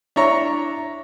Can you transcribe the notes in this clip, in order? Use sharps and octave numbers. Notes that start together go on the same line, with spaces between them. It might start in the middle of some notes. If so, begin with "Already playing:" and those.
D4 E4 C#5 A#5